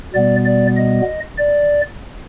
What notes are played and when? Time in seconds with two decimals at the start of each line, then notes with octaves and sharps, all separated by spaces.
0.14 B2 G3 B3 D5
0.46 D5
0.77 D#5
1.38 D5